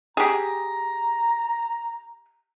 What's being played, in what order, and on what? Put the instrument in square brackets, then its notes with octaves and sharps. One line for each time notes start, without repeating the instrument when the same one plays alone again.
[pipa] G4 G#4 [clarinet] A#5